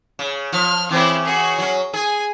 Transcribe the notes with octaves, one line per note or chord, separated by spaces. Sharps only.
C#3
F3 F6
C#3 E3 C4 E4
F#4 G#4
F#3 C#4
G#4 G#5